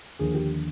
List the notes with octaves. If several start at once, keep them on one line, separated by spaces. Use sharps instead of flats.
D#2 D3 F3 G#4
G4